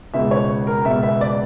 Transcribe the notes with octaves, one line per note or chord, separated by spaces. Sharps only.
C#2 B2 E5
C#5
A#4
C#2 B2 E5
E5
D5